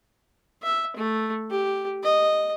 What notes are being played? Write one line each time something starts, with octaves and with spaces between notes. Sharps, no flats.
E5
A3
G4
D#5